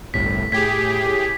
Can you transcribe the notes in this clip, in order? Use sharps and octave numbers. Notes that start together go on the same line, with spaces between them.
G1 C2 A2 B6
A2 G4 G#4 G#6 B6